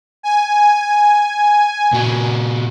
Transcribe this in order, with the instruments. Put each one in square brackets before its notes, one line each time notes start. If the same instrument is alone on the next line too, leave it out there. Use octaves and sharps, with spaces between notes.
[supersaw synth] G#5
[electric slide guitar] A#2 F#4